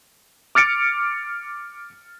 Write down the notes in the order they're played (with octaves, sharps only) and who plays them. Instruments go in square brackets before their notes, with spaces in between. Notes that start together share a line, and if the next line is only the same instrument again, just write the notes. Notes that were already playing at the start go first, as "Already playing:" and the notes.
[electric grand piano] D6 F6 A6 C#7 D7